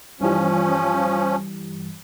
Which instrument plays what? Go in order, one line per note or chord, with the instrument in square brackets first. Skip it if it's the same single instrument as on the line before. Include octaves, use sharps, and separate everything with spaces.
[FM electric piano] G2 E3 G3 [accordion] F3 C#4